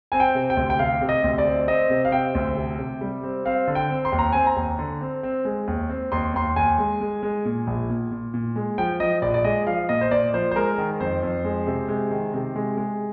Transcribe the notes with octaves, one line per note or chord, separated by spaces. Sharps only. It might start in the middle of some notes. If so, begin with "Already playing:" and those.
C4 G#5
G5
C3
G5
D2
G5
C3 F5
C3
D#5
D2
D5
C4
C4 D#5
C3
F5
C4 G5
D2
C3
C3
G3
C4
C4 F5
D3
G5
C4
C6
D#2
A#5
C4 G#5
A#5
D#2
D3
C4
C4
G#3
D#2
C4
D#2 C6
D#2 C6
D#2 G#5
G#3
G#3
G#3
A#2
A#1
A#2
A#2
A#2
G#3
F3 G5
F3 D#5
A#1 D5
D5
G#3 D#5
F3 F5
A#2 D#5
C5
A#2 D5
F3 C5
C5
G#3 A#4
D#3
F2 C5
F2
G#3
C3
G#3
D#3
C3
G#3
G#3